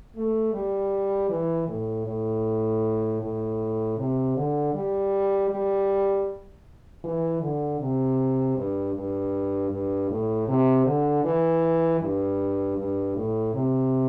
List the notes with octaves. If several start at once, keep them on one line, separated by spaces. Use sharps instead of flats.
A3
G3
E3
A2
A2
A2
C3
D3
G3
G3
E3
D3
C3
G2
G2
G2
A2
C3
D3
E3
G2
G2
A2
C3